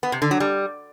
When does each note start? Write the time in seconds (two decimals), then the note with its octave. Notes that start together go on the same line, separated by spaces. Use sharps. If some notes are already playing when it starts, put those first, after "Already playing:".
0.03 B3
0.12 C3
0.22 D3
0.31 F#3
0.40 G3